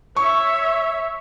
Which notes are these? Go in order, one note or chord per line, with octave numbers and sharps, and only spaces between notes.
C#5 E5 C#6